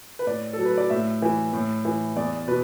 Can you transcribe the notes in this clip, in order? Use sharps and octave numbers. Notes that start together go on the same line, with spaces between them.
B4
A2 D5
A4
F#3
B4
D5
A2 E5
E3
A2
E3
E2 D5
B2 B4